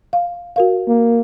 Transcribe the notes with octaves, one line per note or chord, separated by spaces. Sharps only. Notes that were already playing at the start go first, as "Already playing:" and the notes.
F5
F#4 A#4 F5
A#3